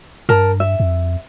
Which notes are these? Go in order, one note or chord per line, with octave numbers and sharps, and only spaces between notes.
G2 A#4 A5
E5
F2